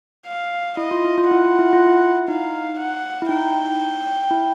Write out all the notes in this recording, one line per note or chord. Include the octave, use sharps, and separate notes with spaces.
F5
E4 D#5
F4
E4
F4
E4 F#5
F4
E4
F4
E4
D#4 F5
F#5
E4
D#4 G5
E4